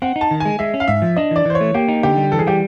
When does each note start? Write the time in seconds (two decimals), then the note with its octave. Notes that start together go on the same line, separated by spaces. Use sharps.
0.02 C4 F#5
0.16 D#4
0.21 A5
0.31 D#3
0.40 G#5
0.45 G#3
0.59 G#3 E5
0.74 C#4
0.80 F5
0.88 G#2 E5
1.02 F3
1.16 D4 D#5
1.31 E3 D5
1.45 E3 C5
1.55 C#5
1.61 A3
1.74 A#3 G4
1.88 D#4
2.03 D3 G4
2.17 G3
2.32 E3 A4
2.39 G#4
2.47 G3 G4